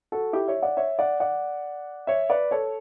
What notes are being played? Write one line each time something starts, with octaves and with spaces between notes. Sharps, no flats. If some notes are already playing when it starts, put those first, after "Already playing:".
F#4 A4
E4 G4
C#5 E5
D5 F#5
C#5 E5
D5 F#5
D5 F#5
C#5 E5
B4 D5
A4 C#5